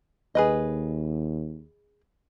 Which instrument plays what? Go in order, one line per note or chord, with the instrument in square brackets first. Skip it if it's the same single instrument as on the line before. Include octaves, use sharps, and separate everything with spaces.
[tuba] D#2 [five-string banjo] G#4 B4 D#5